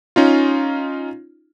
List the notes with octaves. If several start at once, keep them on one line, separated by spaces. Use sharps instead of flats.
C#4 D#4 F4